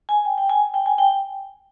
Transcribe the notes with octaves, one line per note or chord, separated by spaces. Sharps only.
G#5
G5
G5
G#5
G5
G#5
G5